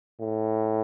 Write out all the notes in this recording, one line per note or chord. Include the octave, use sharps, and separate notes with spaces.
A2